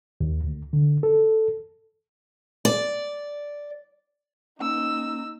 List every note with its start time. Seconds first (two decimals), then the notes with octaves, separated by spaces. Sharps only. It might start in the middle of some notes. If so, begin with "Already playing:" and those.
0.21 D#2
0.44 D2
0.73 D3
1.03 A4
2.65 D5
4.59 A#3 C#4 D#4 E6